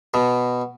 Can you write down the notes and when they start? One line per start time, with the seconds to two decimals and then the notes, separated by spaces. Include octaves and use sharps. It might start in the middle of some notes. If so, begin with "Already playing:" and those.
0.14 B2